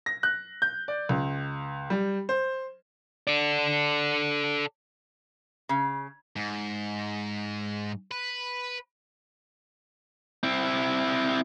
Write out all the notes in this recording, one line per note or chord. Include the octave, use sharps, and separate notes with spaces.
A#6
F#6
G6
D5
C#2
G3
C5
A4 D5
C#3
G#2
B4
C4 E4